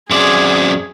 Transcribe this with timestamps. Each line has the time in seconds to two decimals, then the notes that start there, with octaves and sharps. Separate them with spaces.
0.11 F#2 C4 G#4 D5